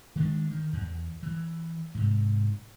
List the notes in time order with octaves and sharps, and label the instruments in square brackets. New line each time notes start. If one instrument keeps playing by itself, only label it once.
[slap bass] D#3 G#3 A#3 D4
D#3
E2
E3
G#2 C3